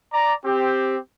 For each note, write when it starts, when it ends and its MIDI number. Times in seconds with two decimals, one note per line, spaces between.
0.13 0.34 74
0.13 0.34 82
0.45 0.97 60
0.45 0.97 67